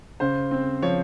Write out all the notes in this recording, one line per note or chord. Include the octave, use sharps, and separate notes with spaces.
C#3 C5
C4
F3 C#5